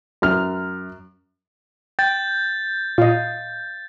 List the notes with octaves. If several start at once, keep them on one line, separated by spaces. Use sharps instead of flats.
F#2 F6
G5 G6 A6
A#2 D#5 F5